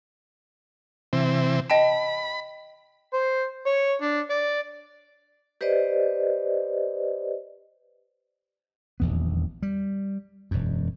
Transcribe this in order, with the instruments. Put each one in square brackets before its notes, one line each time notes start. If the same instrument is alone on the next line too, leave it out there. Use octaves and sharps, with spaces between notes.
[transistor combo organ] C3 E3 C4
[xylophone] D#5 G5 A5 [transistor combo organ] B5
[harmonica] C5
C#5
D4
D5
[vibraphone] G4 B4 C5 D5 D#5
[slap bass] D#1 A#1 E2 B3
G3
E1 F#2